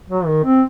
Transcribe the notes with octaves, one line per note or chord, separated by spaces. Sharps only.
F#3
D#3
C4